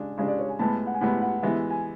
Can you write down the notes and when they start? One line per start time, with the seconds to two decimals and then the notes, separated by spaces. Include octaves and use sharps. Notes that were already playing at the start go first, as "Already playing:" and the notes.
Already playing: C#3 G#3 D4
0.18 C#3 G#3 D4
0.28 D5
0.39 C#5
0.49 G#5
0.59 A2 G#3 B3 A5
0.87 F#5
0.94 G#5
1.01 A2 G#3 B3 F#5
1.22 F#5
1.43 E3 G#3 B3 E5
1.71 G#5